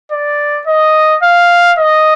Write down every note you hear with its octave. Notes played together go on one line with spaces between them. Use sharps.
D5
D#5
F5
D#5